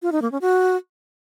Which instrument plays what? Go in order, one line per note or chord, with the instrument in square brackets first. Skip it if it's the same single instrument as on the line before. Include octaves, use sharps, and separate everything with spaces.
[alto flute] F4
D#4
A#3
C#4
F#4